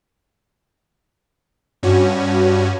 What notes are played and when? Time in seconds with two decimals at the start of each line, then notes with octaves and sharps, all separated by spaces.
1.83 G2 C#4 F#4